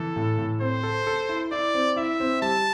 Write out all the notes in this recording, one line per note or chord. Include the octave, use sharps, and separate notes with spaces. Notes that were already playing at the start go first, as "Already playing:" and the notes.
Already playing: E3 A4
A2
A2
C4 C5
A4
A4
E4
E4 D5
C4
E4 E5
C4
G3 A5